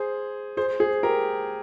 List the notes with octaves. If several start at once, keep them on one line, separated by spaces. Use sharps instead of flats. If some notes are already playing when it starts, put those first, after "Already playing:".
Already playing: G#4 C5
G#4 C5
G#4 C5
G4 A#4